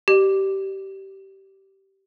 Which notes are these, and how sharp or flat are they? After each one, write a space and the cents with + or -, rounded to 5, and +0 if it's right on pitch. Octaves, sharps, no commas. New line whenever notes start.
G4 -20 D5 +45